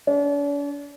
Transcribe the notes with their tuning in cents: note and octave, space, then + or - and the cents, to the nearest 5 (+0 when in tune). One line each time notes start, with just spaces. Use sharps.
D4 -45